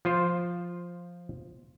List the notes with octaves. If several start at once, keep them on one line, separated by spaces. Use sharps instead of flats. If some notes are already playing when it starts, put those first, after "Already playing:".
F3 F4 C5